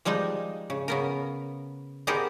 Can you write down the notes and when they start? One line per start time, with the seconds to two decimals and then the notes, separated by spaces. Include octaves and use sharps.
0.05 F3 G3 G#3 D#4
0.70 C#3
0.88 C#3 B3 A#4
2.07 B3 D#4 G4 G#4 A#4 C5